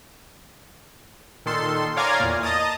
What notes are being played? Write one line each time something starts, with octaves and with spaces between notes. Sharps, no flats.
A#2 D#3 A4 C6
C#5 D5 F5 G#5 A#5 C6
E2 A#2
D#5 A5 A#5 D#6